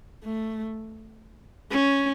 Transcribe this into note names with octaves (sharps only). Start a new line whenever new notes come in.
A3
C#4